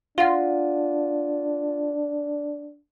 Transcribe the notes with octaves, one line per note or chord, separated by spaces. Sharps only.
D4 F4 F5 F#5